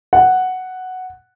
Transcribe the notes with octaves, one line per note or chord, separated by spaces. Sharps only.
F#5